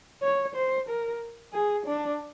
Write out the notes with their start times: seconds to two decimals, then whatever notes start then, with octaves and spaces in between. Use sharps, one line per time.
0.23 C#5
0.55 C5
0.89 A#4
1.53 G#4
1.86 D4